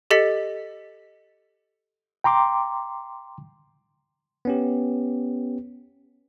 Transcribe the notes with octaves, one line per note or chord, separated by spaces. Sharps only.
G4 A4 D#5 A6 B6 C#7
G5 A#5 C6 D6
B3 C#4 G4